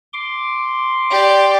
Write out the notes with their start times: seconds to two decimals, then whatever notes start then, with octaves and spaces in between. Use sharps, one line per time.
0.13 C6 D6
1.10 G4 D5